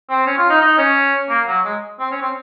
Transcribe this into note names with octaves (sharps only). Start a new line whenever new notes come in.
C4
C#4
F4
D#4
D#4
C#4
A#3
F#3
G#3
C4
C#4
C4